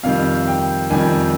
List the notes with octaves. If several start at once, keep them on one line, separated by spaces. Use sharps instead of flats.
F2 C3 D#3 G3 F5
G5
F2 C3 D#3 G3 G#5